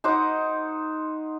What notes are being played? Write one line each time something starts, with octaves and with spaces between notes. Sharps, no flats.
D#4 C5 F#5 D6